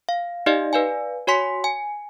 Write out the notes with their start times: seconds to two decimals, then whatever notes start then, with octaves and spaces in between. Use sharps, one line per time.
0.09 F5
0.46 D#4 G4 D5 D#5 F5
0.73 B4 D5 F5 G#5
1.27 F#4 C#5 G#5 C6 B6
1.64 G#5